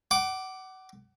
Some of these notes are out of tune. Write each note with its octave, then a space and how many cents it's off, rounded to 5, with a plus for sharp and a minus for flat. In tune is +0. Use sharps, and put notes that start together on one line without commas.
F#5 +30 D6 +0